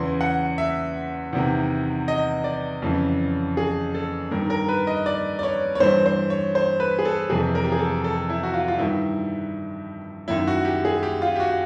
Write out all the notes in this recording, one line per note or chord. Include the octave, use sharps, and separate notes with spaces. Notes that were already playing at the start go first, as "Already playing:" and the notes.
Already playing: E2 C#3 E3 C6
F#5
E5
E2 C3 D#3
D#5
D5
F2 C#3 E3
G#4
A4
G2 D#3 A#4
A#4
B4
D#5
D5
D5
C#5
C#5
G2 E3 C5
C5
C#5
C5
B4
G#4
A4
F2 C3 E3 G#4
A#4
G4
G#4
A4
A4
E4
F#4
F4
F4
G2 D#3 E4
F#2 D#3 E4
F#4
G4
G#4
G4
F4
G4
F#4